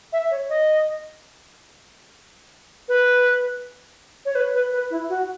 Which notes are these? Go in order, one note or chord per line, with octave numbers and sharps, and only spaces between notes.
E5
C#5
D#5
B4
C#5
B4
B4
B4
E4
F#4